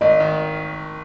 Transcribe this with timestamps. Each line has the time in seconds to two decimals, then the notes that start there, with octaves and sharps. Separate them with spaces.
0.01 G#1 D#5
0.20 D#3